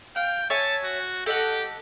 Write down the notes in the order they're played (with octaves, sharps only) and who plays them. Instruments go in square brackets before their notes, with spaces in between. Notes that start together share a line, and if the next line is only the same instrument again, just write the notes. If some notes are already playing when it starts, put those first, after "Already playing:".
[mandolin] F5 [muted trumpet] G5
[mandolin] C#5 E5 G#5 [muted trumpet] A5
[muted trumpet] F#4
[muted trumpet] G4 [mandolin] A4 D#5 F#5